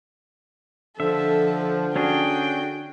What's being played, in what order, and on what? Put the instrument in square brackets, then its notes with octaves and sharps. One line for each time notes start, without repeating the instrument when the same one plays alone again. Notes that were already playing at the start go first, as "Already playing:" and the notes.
[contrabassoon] D3 [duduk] F3 [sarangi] A4 [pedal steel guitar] E5
[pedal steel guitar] C#4 D4 G#4 [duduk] F#4 [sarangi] G5